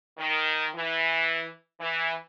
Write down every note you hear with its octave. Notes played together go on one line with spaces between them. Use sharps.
D#3
E3
E3